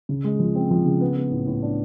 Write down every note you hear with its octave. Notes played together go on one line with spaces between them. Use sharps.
C#3
G#3
F3
C4
F3
C#3
B3
B3
A2
A2
D4